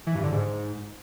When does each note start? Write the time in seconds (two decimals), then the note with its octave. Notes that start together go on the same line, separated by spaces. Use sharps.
0.07 E3
0.15 G2
0.24 D3
0.32 G#2